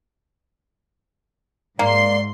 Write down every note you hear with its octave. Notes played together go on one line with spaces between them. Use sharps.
G#2 A#3 D5 C6